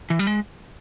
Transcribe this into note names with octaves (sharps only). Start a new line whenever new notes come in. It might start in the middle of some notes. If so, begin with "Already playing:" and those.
E3
G3
G#3